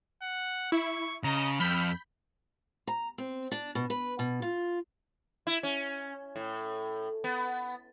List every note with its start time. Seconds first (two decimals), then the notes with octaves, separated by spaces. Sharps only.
0.22 F#5
0.72 E4 C#6
1.24 C#3 D#5 A#5
1.60 F2 B5 F6 G6 B6
2.87 A#5
3.18 C4
3.52 D4
3.75 B2
3.90 B4
4.19 B2
4.42 F4
5.47 E4
5.63 C#4
6.36 A2
7.24 B3